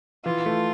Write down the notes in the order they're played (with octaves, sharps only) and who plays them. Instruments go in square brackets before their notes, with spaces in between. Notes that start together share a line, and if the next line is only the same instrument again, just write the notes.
[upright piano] E3 [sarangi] F4
[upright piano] A3